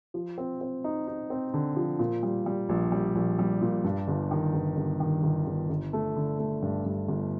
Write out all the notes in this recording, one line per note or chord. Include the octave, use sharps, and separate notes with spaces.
F3
C4
C4
D#4
D#4
C4
D3
F3
A#2
G3
G3
A#1
G3
A#1
G3
A#2
G2
G1
D#3
G1
G1
D#3
G1
G1
G1
A3
D3
A3
G2
G2
G1